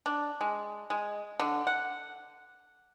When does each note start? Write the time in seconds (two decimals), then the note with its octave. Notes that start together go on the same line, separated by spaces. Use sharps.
0.06 D4
0.41 G#3
0.90 G#3
1.40 D3
1.67 F#5